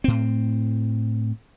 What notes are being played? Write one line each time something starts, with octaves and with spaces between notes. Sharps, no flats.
A2 C4